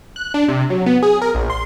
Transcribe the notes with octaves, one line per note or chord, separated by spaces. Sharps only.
F#6
D4
C3
F#3
B3
G#4
A#4
A#1
C6